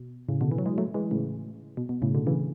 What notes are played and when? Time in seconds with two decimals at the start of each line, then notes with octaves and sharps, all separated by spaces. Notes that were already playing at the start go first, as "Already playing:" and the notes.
Already playing: B2
0.29 A2 C#3
0.41 B2 D3
0.51 E3
0.58 F#3
0.66 E3 G#3
0.78 F#3 A3
0.94 E3 G#3
1.11 A2 C#3
1.77 B2
1.89 B2
2.02 A2 C#3
2.15 B2 D3
2.27 C#3 E3